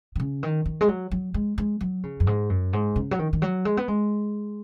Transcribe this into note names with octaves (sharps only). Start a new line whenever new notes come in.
D#3
C#3
D#3
D#3
G#3
F#3
F#3
G#3
G#3
F#3
C#3
F#2
G#2
F#2
G#2
C#3
F#3
D#3
D#3
F#3
G#3
B3
G#3